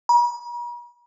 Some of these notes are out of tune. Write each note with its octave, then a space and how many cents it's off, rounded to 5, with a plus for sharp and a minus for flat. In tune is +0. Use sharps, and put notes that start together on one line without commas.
A#5 +45